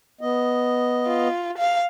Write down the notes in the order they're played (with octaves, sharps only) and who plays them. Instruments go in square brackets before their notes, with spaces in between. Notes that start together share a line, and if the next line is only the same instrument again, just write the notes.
[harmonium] B3 D#5
[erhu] F4
F5